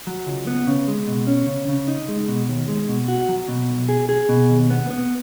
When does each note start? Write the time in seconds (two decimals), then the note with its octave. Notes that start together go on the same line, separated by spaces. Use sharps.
0.07 F#3
0.26 C#2
0.47 B3
0.67 C#3
0.88 G#3
1.07 B2
1.27 C#4
1.47 C#3
1.68 C#3
1.88 D#4
2.08 G#3
2.28 B2
2.49 D#2
2.68 G#3
2.89 B2
3.08 F#4
3.29 F#3
3.48 B2
3.70 B1
3.89 G#4
4.09 G#4
4.29 B2
4.50 D#2
4.70 B3
4.90 B3